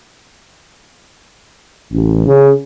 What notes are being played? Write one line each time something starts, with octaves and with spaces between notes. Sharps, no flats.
A1
C#3